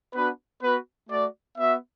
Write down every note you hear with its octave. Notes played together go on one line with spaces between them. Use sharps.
B3 D4 F#4 B4
B3 F#4 B4
A3 F#4 D5
B3 F#4 E5